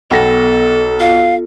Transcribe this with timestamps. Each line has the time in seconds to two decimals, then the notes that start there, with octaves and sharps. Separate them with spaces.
0.11 B1 B3 A4 F#5 G5 A#6
1.00 F4 F5